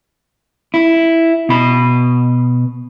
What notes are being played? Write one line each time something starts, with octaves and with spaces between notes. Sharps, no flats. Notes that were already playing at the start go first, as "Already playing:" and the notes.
E4
B2 B5